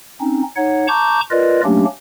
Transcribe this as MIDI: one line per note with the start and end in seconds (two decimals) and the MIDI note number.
0.20 0.42 60
0.20 0.42 61
0.20 0.42 63
0.56 0.87 63
0.56 0.87 73
0.56 0.87 78
0.88 1.21 81
0.88 1.21 82
0.88 1.21 85
0.88 1.21 86
0.88 1.21 91
1.31 1.61 65
1.31 1.61 70
1.31 1.61 71
1.31 1.61 74
1.31 1.61 75
1.64 1.85 54
1.64 1.85 57
1.64 1.85 58
1.64 1.85 61
1.64 1.85 62
1.64 1.85 67